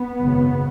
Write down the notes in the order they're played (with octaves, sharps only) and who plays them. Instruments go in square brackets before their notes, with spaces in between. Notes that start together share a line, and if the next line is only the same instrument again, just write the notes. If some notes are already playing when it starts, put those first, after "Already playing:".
Already playing: [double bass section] B3
G#1 F#2 C#3